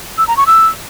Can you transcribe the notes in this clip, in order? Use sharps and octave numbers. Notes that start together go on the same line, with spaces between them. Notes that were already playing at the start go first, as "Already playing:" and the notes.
E6
A#5
C#6
E6